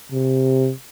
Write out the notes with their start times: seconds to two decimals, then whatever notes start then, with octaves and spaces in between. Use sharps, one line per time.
0.12 C3